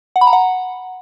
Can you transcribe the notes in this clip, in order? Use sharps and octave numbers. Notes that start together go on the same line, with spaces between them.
F#5
B5
A#5
F#5